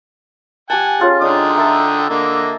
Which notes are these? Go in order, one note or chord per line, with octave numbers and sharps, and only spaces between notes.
G4 F#5 G#5 A5
C#4 F4 G#4
D3 G#3 D4 D#4 G5 D#6
A4 E5 A#5
D3 A#3 D#5